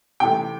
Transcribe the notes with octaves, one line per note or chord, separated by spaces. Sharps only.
C3 E3 A3 G5